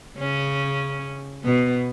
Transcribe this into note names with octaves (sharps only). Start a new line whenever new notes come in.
C#3 C#4
B2 B3